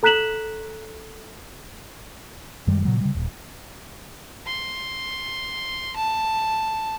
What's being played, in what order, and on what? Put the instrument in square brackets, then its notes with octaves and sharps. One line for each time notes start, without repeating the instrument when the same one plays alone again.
[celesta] A4 A#5 F#6 B6 E7 F#7
[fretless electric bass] F#2 D#3 G3 G#3
A#2 C#3 F#3
C#3 G3
D#1
[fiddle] C6
A5